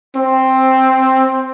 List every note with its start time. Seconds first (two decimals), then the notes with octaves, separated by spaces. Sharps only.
0.16 C4